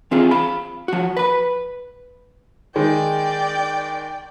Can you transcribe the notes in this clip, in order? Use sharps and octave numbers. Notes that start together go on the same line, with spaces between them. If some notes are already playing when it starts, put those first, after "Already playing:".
E3 C4 F4 G#4
F5 B5
F3 F#4
B4 B5
D#3 G#3 D5 G5